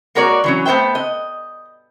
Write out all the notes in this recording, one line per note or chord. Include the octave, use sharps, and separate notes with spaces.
G#3 A#3 F#4 A#4 C#5 D5
E3 F#3 C#4
A3 B3 C5 E5 G5
D#5